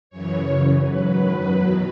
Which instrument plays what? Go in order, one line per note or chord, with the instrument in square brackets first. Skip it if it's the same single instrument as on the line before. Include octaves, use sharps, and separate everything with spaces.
[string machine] F#2 C#3 E3 C#5
F#2 C#3 E3
G#2 F#3 B4
F#2 D#3 F#3
E2 B2 F#3